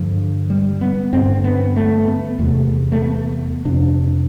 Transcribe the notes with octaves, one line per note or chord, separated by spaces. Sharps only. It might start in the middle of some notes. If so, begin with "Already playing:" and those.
Already playing: G2 D3 F3
G3
B3
G2 D3 C4
B3
A3
B3
E2 C3 A3
A3
B3
F2 C3 D4